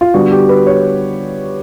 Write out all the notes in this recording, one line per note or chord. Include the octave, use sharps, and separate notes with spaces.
F4
D3 G3 B3 F#4
G4
B4
C#5